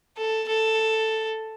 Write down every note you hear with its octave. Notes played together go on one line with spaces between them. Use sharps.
A4
A4